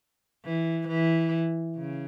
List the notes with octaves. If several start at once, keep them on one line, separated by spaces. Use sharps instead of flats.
E3
E3
C#3